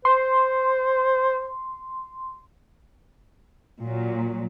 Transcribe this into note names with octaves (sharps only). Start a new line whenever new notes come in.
C5 C6
A#2 F#3